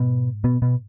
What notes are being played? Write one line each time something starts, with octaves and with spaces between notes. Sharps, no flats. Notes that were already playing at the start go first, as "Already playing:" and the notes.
Already playing: G#2 B2 B3
B2 B3
B2 B3